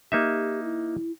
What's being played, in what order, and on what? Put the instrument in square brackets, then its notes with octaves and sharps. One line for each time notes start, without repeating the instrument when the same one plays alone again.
[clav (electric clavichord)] A#3 D#4 E5 [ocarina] G4
[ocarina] E4